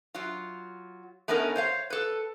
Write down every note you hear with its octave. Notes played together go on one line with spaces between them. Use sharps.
F#3 F4
A3 B3 C#4 D#4 A#4
C5 C#5 F5
A4 B4